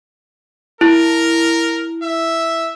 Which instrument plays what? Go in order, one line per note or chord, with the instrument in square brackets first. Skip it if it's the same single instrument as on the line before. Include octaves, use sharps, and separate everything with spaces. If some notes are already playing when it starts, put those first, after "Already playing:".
[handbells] E4 [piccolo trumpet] A#4
[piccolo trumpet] E5